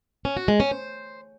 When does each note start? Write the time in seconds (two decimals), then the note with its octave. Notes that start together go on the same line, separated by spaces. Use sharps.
0.25 C#4
0.37 F#4
0.48 G#3
0.60 C#4
0.71 C5